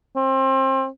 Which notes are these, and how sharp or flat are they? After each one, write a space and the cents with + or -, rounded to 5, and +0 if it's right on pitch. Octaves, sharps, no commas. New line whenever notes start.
C4 +30